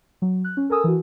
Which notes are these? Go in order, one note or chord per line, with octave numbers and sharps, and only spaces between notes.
F#3
F#6
C#4
A4 A#4 G#5 D#6 E6
E3 F#4